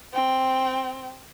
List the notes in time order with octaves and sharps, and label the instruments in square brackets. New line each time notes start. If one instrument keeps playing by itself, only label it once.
[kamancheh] C4 G5